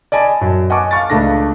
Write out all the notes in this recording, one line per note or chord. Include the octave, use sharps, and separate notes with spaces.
D5 D#5 G#5 A5 B5
F#2
D#5 F#5 G#5 A5 C#6 D6
F5 C#6 A6
C#2 A3 D4 A#6